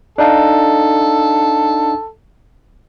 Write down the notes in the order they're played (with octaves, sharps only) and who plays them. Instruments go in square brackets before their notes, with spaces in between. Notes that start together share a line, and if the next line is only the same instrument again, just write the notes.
[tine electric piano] D4 D#4 F5 [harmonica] A4